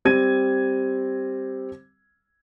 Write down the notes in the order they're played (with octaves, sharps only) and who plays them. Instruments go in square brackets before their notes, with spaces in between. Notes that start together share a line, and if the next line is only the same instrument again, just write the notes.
[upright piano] G3 C4 G#6 D#7